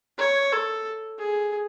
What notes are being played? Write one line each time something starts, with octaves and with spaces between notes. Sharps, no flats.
C#5
A4
G#4